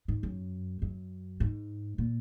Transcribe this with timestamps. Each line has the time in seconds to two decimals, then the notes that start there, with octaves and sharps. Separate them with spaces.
0.08 G#2
0.23 F#2
0.82 F#2
1.40 G#2
1.98 A#2